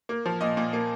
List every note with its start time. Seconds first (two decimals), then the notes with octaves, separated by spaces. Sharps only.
0.09 A#3
0.26 F3
0.41 A#2 D#5
0.57 A#2
0.73 A#3